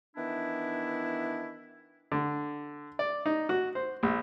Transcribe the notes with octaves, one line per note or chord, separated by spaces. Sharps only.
D#3 E3 B3 D4 E4
D3
D5
D#4
F#4
C5
A#1